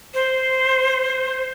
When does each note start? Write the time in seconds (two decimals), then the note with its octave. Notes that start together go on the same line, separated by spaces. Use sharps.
0.14 C5